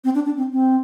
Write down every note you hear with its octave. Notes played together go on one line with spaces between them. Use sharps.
C4
D4
D4
C4
C4